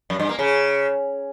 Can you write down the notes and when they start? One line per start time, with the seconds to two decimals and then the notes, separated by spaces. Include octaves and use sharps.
0.10 F#2
0.20 G2
0.29 A#3
0.39 C#3